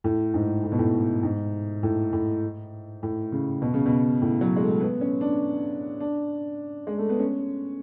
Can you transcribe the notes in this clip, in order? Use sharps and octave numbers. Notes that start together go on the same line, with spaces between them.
A2
G#2
A2
B2
A2
G#2
A2
A2
A2
C#3
B2
C#3
B2
A2
F#3
G#3
A3
B3
C#4
D4
D4
G#3
A3
B3
C#4